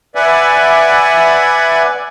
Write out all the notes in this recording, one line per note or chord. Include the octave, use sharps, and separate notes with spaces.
B4 D5 E5 F#5 G#5